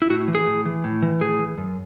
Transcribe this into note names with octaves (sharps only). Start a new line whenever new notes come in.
E4
A2 F#4
E3
G#4
A2
E3
A2
E3
A2 G#4
E3
F#2